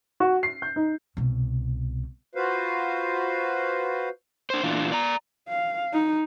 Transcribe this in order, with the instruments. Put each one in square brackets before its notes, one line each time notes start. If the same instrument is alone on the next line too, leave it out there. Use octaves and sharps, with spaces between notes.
[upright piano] F#4
C7
G6
D#4
[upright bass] C2 B2
[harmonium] F4 F#4 B4 C5 F5
[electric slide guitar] D4 C5
A#2 E3 D4 F4
D5 A#5
[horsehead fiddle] F5
D#4